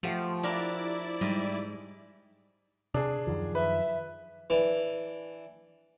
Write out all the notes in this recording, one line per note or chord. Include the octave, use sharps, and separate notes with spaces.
F3 A3 G4 F#5 G5
D4 E4 A#4 D5
G#2 G3
C3 D4 G#4
F#2 D#3 F3
B4 E5
E3 D4